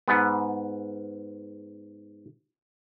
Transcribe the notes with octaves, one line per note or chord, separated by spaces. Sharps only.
G#2 B3